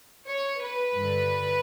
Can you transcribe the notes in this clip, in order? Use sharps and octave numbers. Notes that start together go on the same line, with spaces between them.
C#5
B4
G2 D3